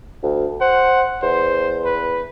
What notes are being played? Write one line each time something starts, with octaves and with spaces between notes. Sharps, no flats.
D2
C5 F#5
E2 C5
B4